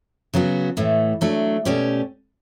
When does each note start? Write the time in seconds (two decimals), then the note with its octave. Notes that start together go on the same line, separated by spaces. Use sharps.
0.34 C#3 F#3 B3 F#4
0.77 A2 E3 A3
1.21 F#3 A3 D4
1.65 B2 A3 C#4 G4 D5